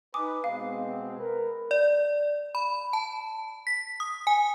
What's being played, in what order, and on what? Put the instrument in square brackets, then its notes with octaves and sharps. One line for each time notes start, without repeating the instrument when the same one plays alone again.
[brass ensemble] D#4 B4 [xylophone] G#5 D6 D#6
[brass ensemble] B2 G#3 C4 [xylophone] F5
[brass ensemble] A#4 B4
[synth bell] D5
B5
A5
B6
D#6
G#5